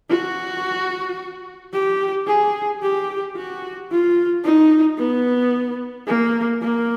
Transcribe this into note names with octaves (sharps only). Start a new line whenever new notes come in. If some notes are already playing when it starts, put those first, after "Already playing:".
F#4
G4
G#4
G4
F#4
F4
D#4
B3
A#3
A#3